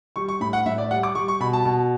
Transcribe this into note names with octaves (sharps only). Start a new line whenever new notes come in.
G3 C#6
C#6
A2 B5
F#5
A2 E5
D5
G3 F#5
D6
G3 C#6
C#6
B2 B5
A5
B2